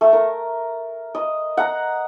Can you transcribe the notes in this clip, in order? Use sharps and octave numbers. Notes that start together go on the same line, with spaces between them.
A3
A#4
D#5
F#5 A#5